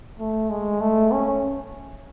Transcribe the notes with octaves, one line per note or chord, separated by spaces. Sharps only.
A3
G#3
A3
C#4